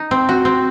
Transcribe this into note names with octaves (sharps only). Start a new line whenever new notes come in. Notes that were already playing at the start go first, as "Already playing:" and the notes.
Already playing: D#4
C4
F#4
C4